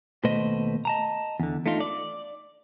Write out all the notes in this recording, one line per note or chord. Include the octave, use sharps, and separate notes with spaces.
D#2 B2 A3 B4 C5 D#5
D#5 A5 A#5
E2 D3
A3 D4 D#4 F4
D5